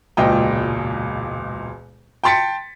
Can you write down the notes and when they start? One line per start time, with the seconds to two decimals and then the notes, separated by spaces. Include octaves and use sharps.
0.17 E1 C#2 A#2 D#5 G5
2.24 G5 A5 C6 A6 B6 C#7